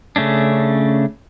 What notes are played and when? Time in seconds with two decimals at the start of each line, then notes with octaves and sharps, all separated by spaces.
0.16 C#3 A3 C#4 D4